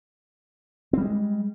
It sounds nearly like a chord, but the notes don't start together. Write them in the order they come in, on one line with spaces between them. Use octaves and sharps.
C4 G3 G#3